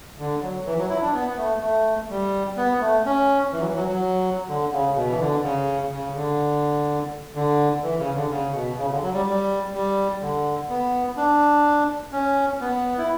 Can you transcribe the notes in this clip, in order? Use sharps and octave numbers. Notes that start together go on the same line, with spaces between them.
D3
F#3
E3
F#3
E4
D4
B3
B3
A3
A3
G3
B3
A3
C#4
E3
F#3
E3
F#3
F#3
D3
C#3
B2
E3
D3
C#3
C#3
D3
D3
E3
C#3
D3
C#3
B2
C#3
D3
F#3
G3
G3
G3
D3
B3
D4
C#4
B3
E4